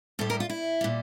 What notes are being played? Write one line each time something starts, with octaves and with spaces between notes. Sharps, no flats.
A2 G3 A4
A#4
F4
E4
A#2 G3